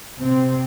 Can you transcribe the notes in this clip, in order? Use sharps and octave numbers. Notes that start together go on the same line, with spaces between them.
C3 C4